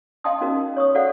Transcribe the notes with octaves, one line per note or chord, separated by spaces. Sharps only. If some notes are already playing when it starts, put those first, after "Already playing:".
D#5 F5 G5 A5 C6 D#6
C#4 D#4 F#4 A#4
C#5 C#6 D#6
F#4 A4 C5 D5 F5 F#5